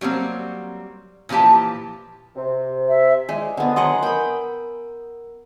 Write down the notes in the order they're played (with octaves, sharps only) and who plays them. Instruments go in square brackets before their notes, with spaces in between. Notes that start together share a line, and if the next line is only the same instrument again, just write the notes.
[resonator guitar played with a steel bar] F#3 G3 A#3 C4
A#2 E3 F3 G4 A5
[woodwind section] C3
[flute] E5
[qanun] G#3 [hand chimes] D5
[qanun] D3 B3
[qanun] F#3 D#5 F#5 [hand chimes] G#5 C6 D#6
[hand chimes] A#4 [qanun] G5 B5